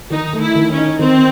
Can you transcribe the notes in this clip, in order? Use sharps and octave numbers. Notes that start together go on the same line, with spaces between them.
D#3 D#4
A3
E4
D#3
C#4
D#4
D#3 C4